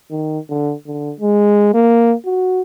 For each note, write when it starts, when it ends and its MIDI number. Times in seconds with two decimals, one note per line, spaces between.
0.11 0.39 51
0.49 0.73 50
0.87 1.13 50
1.20 1.72 56
1.74 2.15 58
2.25 2.62 66